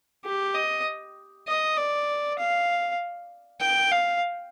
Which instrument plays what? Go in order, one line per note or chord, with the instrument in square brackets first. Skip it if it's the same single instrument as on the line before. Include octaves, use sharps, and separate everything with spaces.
[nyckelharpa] G4
D#5
D#5
D5
F5
G5
F5